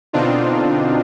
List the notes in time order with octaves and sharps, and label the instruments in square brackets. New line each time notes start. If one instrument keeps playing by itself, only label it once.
[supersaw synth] B2 D3 C4 D4 D#4 F4